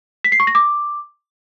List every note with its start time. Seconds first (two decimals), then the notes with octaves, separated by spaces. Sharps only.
0.24 B6
0.32 C7
0.40 C#6
0.47 A#6
0.55 D6